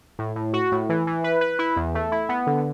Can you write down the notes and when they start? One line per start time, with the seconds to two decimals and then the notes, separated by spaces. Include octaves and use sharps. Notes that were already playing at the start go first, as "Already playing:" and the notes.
0.19 A2
0.36 A2
0.53 F#4
0.72 A2
0.89 E3
1.07 E3
1.24 B4
1.41 B4
1.59 E4
1.77 E2
1.95 A3
2.12 E4
2.29 B3
2.47 D3